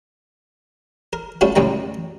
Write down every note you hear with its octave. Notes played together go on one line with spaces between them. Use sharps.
A#4
G3 A3 C#4 F4 F#4
C#2 F#2 A2 G3 A#5